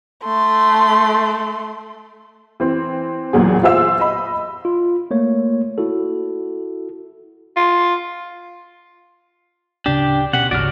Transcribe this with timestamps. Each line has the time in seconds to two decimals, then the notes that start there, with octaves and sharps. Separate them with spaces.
0.24 A3 C6
2.60 E3 C4
3.33 A1 E2 A#2 F#3 G#4
3.63 F4 G#4 C5 E5 F5 E6
4.00 D#5 B5
4.65 F4
5.11 A3 A#3 C#5
5.78 E4 F#4 A4
7.56 F4
9.86 D1 C#3 D4 G4
10.33 B2 C#4 G4 F#5
10.51 G#1 C#2 C#3 C#4 F#4 D5 F6